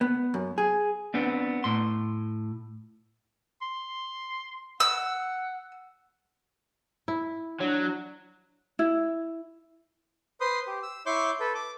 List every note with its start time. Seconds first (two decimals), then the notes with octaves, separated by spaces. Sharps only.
0.01 B3
0.34 F#2
0.58 G#4
1.14 B3 C4 D4
1.64 A2 C6
3.62 C6
4.80 F#5 E6
7.08 E4
7.61 F#3 D4
8.79 E4
10.41 B4 C5 C6 D#6
10.67 G4
10.83 E6
11.06 E4 C#5 C6 D6 G6
11.40 A4 B4
11.55 D6